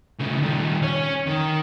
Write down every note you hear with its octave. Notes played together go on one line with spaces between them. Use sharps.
C#3 A3
D#3 G3
C#4 C#5
D#3